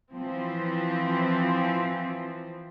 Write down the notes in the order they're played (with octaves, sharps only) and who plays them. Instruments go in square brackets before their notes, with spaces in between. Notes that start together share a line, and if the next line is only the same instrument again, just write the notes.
[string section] E3 F3 C4